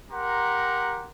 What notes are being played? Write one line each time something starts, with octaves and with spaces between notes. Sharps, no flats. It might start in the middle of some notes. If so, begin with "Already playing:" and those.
G4 A#4 F#5 A#5 C6